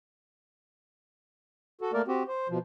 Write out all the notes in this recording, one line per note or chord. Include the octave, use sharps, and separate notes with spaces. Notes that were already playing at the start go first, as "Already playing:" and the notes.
F#4 A4
A3 A#3 A#4 D5
C4 F#4 G4
C5
B2 F3